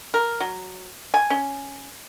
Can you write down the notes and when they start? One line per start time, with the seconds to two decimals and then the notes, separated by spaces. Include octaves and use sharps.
0.14 A#4
0.40 F#3
1.14 G#5
1.30 C#4